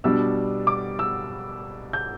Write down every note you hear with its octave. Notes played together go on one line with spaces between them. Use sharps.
B2 G3 D4 E6
D6
E6
G6